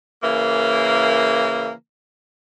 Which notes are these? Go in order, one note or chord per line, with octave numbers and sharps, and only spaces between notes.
C#3 E3 A#3